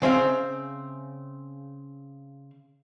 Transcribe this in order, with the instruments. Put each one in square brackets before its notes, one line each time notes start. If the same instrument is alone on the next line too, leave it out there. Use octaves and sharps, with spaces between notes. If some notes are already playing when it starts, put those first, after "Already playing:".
[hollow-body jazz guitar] C#3 C4 E5 F5